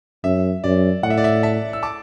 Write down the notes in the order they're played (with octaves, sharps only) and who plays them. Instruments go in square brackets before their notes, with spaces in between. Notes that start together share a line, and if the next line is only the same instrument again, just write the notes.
[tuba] F#2 [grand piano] E5
[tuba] F#2 [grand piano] D5
[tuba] A2 [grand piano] F#5
[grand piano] E5
D5
E5
E5 A5
E6
A5 D6